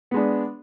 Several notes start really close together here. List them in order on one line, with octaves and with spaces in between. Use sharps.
B3 G#3 D4